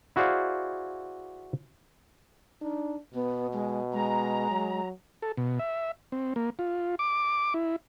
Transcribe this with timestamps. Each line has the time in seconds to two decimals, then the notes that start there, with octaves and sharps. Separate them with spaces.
0.16 E4 F#4 G#4 C5 D5 F5
2.62 D4 D#4
3.14 B2 B3
3.53 G#3
3.93 G#3 A#5
4.51 F#3
5.22 A4
5.37 B2
5.59 E5
6.12 C4
6.36 A#3
6.59 F4
6.99 D6
7.54 E4